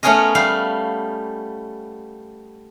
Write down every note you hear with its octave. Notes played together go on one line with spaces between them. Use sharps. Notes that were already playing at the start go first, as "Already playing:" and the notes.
A3 B3 C#4 G#4 A#4 D#5
G3 A3 F5